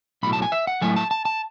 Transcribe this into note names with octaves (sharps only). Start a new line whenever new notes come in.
B1 A2 F#3 B5
A5
G#5
E5
F#5
A2 F#3 A3 G#5
A5
A5
A5